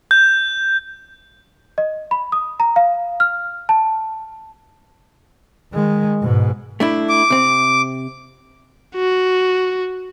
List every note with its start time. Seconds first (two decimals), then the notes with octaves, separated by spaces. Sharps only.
0.11 G6
1.78 D#5
2.11 B5
2.32 D#6
2.60 A#5
2.76 F5
3.20 F6
3.69 A5
5.73 D#3 G#3
6.22 G#2 B2
6.80 A3 D4 E4
7.09 D6
7.30 C3 C4
8.95 F#4